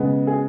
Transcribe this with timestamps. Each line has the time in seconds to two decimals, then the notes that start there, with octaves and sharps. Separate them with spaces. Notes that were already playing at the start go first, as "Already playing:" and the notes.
Already playing: C#3 G#3 B3
0.27 G#4